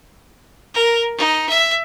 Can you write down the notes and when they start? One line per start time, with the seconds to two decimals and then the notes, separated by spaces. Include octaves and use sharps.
0.74 A#4
1.17 D#4
1.49 E5